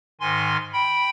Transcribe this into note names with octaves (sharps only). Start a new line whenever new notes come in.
G#2 D#3 G#5 C6
G5 B5